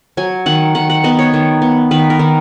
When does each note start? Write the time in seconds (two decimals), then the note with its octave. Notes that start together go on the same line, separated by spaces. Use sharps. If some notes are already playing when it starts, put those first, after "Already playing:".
0.17 F#3 G#5
0.46 D#3 F#5
0.75 D#3 F#5
0.90 F#5
1.04 B3 D#5
1.19 C#5
1.34 D#3
1.62 B3
1.91 D#3 B4
2.10 A#4
2.19 D#3